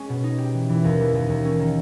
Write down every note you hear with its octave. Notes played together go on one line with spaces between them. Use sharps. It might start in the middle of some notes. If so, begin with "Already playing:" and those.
Already playing: G#3 C#4
B2
D#4
G4
E3
E3
D#2
E3
D#2
D#2
C#4
D#3